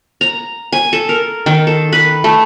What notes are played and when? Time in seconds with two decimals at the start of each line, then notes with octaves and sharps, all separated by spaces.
0.21 A#5
0.72 G#5
0.93 A4
1.09 A#4
1.46 D#3
1.67 A4
1.92 B4
2.24 A3